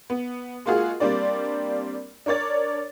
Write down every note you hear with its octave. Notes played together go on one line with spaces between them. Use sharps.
B3
G#3 A#3 F4 F#4 G#4
G3 A#3 C4 D4 D5
D4 A#4 C#5 D5 A6